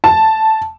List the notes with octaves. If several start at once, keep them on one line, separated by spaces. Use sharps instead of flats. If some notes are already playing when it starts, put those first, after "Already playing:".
A5